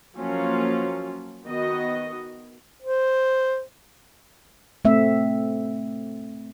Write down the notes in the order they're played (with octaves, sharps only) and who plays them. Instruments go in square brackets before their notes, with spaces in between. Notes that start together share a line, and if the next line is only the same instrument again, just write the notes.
[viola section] F3 F#3 A#3 C#4 F4
D#3 B3 F#4 D#5
[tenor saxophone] C5
[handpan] A3 C4 E5